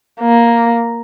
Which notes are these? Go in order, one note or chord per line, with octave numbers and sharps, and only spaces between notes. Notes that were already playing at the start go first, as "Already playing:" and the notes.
A#3